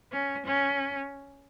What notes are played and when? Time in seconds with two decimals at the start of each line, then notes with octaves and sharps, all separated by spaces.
0.12 C#4
0.46 C#4